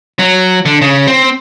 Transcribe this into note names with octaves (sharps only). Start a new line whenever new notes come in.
F#3
D3
C#3
C4